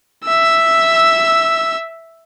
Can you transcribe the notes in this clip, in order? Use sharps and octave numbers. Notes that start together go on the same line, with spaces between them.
E5 E6